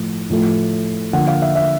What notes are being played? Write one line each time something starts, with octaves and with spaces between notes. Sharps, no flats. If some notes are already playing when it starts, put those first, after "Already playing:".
Already playing: A2 F3 A3
A2 F3 A3
D3 F3 A#3 F#5
F5
E5
E5